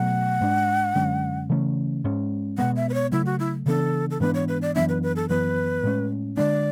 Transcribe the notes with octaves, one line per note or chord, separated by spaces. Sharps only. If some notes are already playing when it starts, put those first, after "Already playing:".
Already playing: B2 F#3 A3 F#5
G#2 G#3 D4
F#2 D3 G#3 C#4
C#3 E3 A3 C#4
G#2 G#3 C#4
B2 G#3 B3 F#5
E5
B4
C#5
C#3 F#3 A3 E4
F#4
E4
C#3 E3 B3 D4 A4
A4
G#2 E3 B3 D4 B4
C#5
B4
D5
F#2 E3 B3 D4 E5
B4
B4
A4
F#2 E3 B3 B4
A2 G#3 C#4
D3 G#3 D4 D5